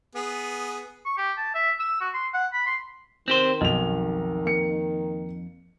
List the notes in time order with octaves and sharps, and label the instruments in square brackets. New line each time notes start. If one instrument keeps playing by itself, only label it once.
[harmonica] B3 G#4
[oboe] C#6
G4
A5
E5
E6
F#4
C6
F#5
B5
C6
[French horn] D#3 [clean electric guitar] C4 G4 C5
[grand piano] B1 F7 [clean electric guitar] F2
[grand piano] A#3 C#7